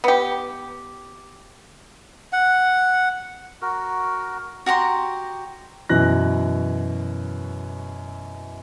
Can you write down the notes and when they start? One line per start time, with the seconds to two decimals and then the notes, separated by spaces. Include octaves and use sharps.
0.04 B3 G4
2.33 F#5
3.62 F#4 A#4
4.66 F#4 G4 A#5 C6
5.89 F#2 B2 E3 F#6 A#6